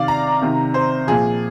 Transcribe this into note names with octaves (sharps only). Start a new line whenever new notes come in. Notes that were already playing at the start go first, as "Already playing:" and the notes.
Already playing: C3 D#3 D5 F5
A#5
C3 D#3
C5
A#2 F3 G#4